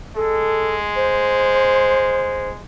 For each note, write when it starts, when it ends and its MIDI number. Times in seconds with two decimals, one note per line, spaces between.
0.16 2.62 56
0.16 0.76 69
0.96 2.49 72